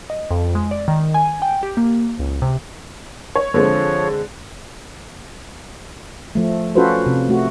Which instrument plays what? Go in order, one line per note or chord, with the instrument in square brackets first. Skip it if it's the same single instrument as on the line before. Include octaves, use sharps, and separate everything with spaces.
[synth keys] D#5
F2
G#3
D5
D#3
G#5
G5
G4
A#3
C#2
C3
[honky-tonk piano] C#5
[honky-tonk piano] D3 G#3 C4 [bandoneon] F3 C#5
[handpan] F3 A3
C#4 F4 F#4 A4 B4 C5
C3
A3 F#4